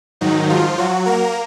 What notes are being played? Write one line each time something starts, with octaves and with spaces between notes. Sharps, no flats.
G#2 D#3 F#3 D#4
F3 F4
F#3 F#4
A#3 A#4